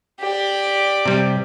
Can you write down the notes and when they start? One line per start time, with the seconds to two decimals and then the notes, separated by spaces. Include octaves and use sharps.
0.20 G4 D5
1.06 C3 G3